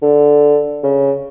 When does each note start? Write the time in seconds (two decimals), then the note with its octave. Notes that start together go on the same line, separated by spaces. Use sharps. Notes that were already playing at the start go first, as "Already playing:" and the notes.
0.02 D3
0.84 C#3